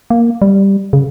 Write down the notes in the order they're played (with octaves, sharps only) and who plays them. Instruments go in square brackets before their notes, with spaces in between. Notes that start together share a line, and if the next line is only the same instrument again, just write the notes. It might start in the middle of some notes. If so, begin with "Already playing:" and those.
[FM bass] A#3
G3
C#3